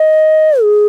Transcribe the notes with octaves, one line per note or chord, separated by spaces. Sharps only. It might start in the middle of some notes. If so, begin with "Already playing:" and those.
Already playing: D#5
G#4